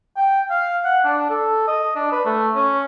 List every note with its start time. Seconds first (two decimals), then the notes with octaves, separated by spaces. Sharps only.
0.16 G5
0.50 F5
0.85 F#5
1.05 D4
1.30 A4
1.68 D#5
1.95 D4
2.12 B4
2.25 A3
2.54 C#4